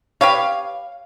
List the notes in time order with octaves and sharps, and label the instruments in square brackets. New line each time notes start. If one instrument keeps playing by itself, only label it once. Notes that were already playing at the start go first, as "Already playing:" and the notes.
[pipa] G4 B4 C#5 [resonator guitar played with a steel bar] F5